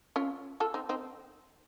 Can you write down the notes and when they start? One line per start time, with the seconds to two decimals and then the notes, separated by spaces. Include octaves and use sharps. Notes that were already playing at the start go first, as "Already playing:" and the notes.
0.16 C#4 F4
0.60 F4 A4
0.74 C4 D#4
0.89 C4 D#4